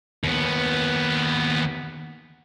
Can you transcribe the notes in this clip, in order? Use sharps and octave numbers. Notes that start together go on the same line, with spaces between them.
D#2 B3